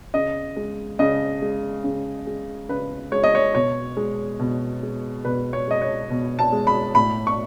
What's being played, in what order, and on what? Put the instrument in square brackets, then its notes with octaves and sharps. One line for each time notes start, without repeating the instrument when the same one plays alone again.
[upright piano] C#3 D#5
G#3
C#3 D#5
G#3
C#3
G#3
C#3 B4
G#3 C#5
D#5
C#5
B2 C#5
G#3
B2
G#3
B2 B4
C#5
G#3 D#5
C#5
B2
A5
G#3
B5
A2 B5
C#6